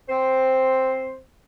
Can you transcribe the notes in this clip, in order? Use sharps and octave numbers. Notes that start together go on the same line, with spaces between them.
C4 C5